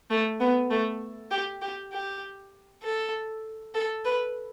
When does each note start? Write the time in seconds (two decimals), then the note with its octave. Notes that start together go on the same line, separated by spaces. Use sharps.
0.10 A3
0.40 B3
0.71 A3
1.31 G4
1.62 G4
1.92 G4
2.83 A4
3.74 A4
4.05 B4